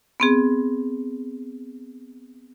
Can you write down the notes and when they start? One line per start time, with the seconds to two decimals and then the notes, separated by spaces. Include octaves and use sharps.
0.20 B3 C4 G#4